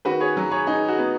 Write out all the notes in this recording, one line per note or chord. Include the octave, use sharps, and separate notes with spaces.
D#3 F#4 B4
G#4 C#5
F#3
G#4 C#5
D#4 G#4
F#4
B3